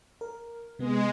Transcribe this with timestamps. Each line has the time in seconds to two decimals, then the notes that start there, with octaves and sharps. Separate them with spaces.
0.21 A#4
0.79 C3 G#3 B3